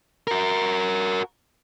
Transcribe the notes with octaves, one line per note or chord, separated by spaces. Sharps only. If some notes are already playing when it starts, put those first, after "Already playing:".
F#4 A#4